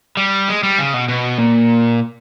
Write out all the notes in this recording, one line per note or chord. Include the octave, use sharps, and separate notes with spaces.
G3
G#3
G3
C#3
B2
B2
A#2